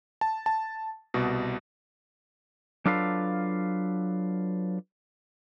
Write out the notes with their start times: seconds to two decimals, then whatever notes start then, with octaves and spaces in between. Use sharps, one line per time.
0.21 A5
0.46 A5
1.14 C2 B2
2.86 F#3 D4 F4 A4 B4 F5